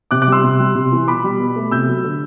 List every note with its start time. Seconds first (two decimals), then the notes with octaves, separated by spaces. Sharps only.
0.11 C3 D6 F#6
0.22 D6 F#6
0.27 G3 C6 E6
0.44 C3
0.60 G3
0.75 C3
0.92 E3
1.07 B2 B5 D6
1.24 G3
1.40 B2
1.56 A3
1.71 C3 E6 G6
1.88 F#3
2.04 D3